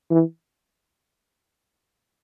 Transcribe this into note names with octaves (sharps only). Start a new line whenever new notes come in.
E3